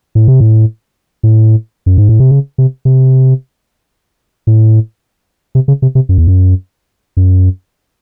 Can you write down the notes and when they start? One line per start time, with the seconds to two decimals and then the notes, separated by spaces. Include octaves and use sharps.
0.15 A2
0.28 C3
0.40 A2
1.23 A2
1.86 F#2
1.98 G#2
2.09 A2
2.20 C3
2.31 C#3
2.58 C3
2.85 C3
4.47 A2
5.55 C3
5.68 C#3
5.82 C3
5.95 C3
6.09 F#2
6.18 E2
6.28 F#2
7.17 F#2